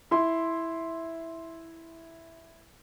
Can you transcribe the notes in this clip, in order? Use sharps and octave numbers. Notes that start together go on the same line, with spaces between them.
E4 C6